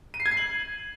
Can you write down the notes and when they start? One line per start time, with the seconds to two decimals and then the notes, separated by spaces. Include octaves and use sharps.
0.14 D#7
0.20 C7
0.26 G#6
0.31 C7
0.37 F#7